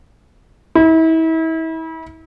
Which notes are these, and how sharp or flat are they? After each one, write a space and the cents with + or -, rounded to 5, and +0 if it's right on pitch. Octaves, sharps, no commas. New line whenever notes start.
E4 -35